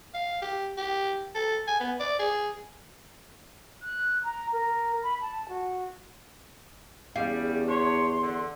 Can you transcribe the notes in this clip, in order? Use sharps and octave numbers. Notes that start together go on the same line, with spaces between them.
F5
G4
G4
A4
G#5
B3
D5
G#4
F#6
A#5
A#4
B5
A5
F#4
E2 C#3 G3 F5
D4 G4 C#5 C6
D3